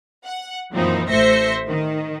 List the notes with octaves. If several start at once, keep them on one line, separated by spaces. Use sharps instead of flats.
F#5
F#2 A#2 E3 F3 C4 D#4
A1 A3 C5 E5 A#6 C#7
D#3